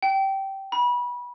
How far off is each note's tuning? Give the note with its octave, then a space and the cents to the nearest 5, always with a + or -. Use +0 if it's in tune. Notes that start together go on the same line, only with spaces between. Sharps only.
G5 -15
B5 -25